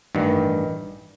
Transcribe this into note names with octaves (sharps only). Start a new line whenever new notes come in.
A1 G2 D#3 G3